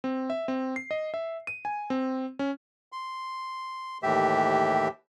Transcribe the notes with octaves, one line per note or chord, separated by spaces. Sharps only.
C4
E5
C4
C7
D#5
E5
D#7
G#5
C4
C#4
C6
D#2 A2 E3 G4 E5